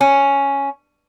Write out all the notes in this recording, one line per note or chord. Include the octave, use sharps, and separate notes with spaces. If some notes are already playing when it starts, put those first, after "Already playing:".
C#4